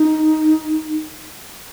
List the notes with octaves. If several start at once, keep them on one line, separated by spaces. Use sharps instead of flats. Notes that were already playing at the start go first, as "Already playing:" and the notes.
Already playing: D#4